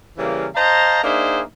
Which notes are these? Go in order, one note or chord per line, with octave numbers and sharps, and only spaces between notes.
C#3 E3 G3 A#3
C5 D#5 F5 A5 A#5
A#3 D4 D#4 G#4 C5 E5